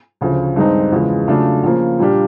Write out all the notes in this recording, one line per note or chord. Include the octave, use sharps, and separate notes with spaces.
D2 C#3 F3
G2 D#3 G#3 C4 D#4
E2 C#3 F3 G#3
C#3 F#3 A3 D4 F4
C#3 F3 A#3
A#2 G3 A#3 D4 G4